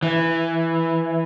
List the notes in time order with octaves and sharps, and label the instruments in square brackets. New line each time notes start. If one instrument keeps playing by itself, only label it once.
[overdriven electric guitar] E3